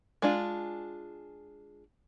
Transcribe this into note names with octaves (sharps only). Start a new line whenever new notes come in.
G#3 D4 F4